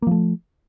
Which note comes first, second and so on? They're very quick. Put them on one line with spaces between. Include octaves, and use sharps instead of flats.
A#3 F3 A3